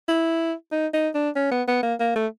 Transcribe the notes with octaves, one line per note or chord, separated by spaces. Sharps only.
E4
D#4
D#4
D4
C#4
B3
B3
A#3
A#3
A3